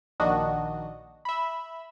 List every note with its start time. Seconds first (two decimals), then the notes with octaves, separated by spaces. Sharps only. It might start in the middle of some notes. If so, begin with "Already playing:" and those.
0.20 A#1 D#3 D4 F#4 D#5
1.25 E5 B5